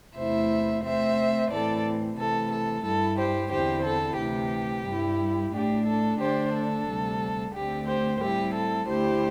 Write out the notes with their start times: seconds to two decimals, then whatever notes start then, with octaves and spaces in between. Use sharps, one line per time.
0.16 E2 C3 A3 E4 C5 E5
0.83 C3 A3 C4 C5 E5
1.50 A2 E3 C4 A4 D5
2.17 C3 E3 A3 A4
2.51 A4
2.85 G2 G3 E4 A4
3.18 G4 C5
3.51 E2 D3 C4 E4 G4 C5
3.84 A4
4.18 D2 C3 E3 G4
4.86 G2 G3 E4
5.52 A2 A3 D4 G4
5.86 A4
6.20 D3 A3 D4 G4 C5
6.53 A4
6.87 D2 C3 G3
7.54 D2 D3 A3 C4 G4
7.87 G4 C5
8.21 A2 G3 C4 E4 G4
8.54 A4
8.87 D2 D3 A3 E4 G4 C5